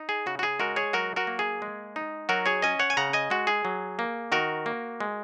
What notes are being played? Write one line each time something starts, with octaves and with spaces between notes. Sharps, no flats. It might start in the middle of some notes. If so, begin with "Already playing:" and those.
Already playing: D#4
G#4
C#3 F#4
F#4
G#4
G#3 F#4 A#4
G#4 C#5
F#3 F#4 A#4
F#4 A#4
A#3
G#4
G#3
D#4
F#3 F#4 A#4
G#4 C#5
C#4 D#5 G#5
C#5 F#5
G#5
C#3 F#5 A#5
D#5 G#5
G#3 F#4
G#4
F#3
A#3
D#3 F#4 A#4
A#3
G#3